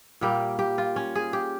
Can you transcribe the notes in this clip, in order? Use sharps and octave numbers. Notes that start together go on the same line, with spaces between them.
A#2 G3 A#3 G4
G4
F4
C#4
G#4
G4